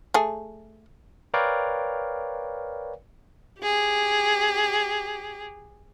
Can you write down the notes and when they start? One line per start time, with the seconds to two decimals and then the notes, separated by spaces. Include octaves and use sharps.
0.14 A3 G#4
1.34 A#4 B4 C#5 D5 F5 G5
3.61 G4 G#4